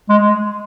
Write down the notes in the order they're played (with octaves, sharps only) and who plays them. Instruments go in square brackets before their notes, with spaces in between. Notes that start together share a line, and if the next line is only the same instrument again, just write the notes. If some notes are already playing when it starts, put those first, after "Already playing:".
[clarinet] G#3